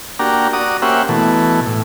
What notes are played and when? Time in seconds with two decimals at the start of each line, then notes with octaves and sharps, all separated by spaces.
0.19 A#3 D4 F#4 G4 A#5
0.53 F#4 D5 A#5 D#6
0.82 A#3 C#4 G4 C5 E5 F#5
1.09 B2 E3 A3
1.66 A2